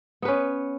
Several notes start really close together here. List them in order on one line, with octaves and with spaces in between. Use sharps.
B3 B4 C#4